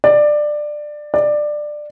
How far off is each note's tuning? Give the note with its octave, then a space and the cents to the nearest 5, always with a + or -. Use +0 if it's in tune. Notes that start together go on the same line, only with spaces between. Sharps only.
D5 +15
D5 +15